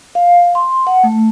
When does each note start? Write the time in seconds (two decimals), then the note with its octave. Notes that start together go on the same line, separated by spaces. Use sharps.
0.15 F5
0.55 C6
0.87 F#5
1.03 A3